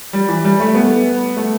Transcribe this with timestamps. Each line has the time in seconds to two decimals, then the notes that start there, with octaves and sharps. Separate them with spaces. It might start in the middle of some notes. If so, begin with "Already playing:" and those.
0.13 G3
0.29 E3
0.45 G3
0.60 A3
0.75 B3
1.37 A3